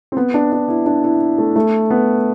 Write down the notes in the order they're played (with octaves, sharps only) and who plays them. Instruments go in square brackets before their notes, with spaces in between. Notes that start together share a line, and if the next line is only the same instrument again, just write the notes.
[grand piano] C4
B3
D4
D4
E4
D4
E4
A3
A3
B3